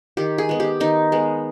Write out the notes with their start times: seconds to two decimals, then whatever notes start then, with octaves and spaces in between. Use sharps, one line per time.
0.17 D#3 G4
0.38 G#4
0.49 G#3 B3
0.60 G4
0.80 D#3 D#4
1.12 G#3 B3